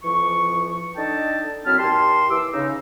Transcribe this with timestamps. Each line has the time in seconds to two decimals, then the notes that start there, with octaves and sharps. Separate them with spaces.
0.04 F2 E3 F3 C#6
0.96 D4 D#4 A4 D#5 G5 A5
1.66 F#2 F#3 C4 E4 A5 F6
1.79 D#2 G4 A5 C6
2.30 E3 D6 E6
2.53 C#3 D#4